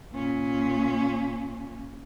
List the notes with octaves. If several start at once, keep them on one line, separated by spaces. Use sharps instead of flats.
A#2 C#4